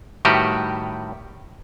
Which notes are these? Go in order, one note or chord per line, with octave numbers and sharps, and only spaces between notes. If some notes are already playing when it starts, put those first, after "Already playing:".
A2 D#3 G3 F#4 G4 B4